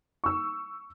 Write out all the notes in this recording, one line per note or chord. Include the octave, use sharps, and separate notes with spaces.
C#6 E6